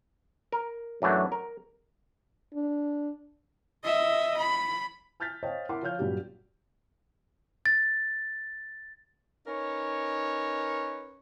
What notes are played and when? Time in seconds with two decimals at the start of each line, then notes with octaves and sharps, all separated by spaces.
0.52 A#4
1.02 F#2 E3 F#3 A3 D4
1.32 A#4
2.54 D4
3.84 D#5 E5
4.37 B5
5.20 A5 F6 G6 A6 B6
5.43 C5 C#5 D#5 F5 G5 A5
5.69 E4 A#4 F#5 C6 D6
5.83 F3 C#5 F5 F6 G6
5.99 G2 A#2 F#3 G4
7.66 A6
9.47 C#4 D#4 A#4 B4 C#5